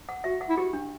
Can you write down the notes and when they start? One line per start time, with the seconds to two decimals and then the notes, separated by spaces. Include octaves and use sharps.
0.09 F#5
0.24 F#4 E5
0.41 F#5
0.49 E4
0.57 F#4 G4
0.73 D4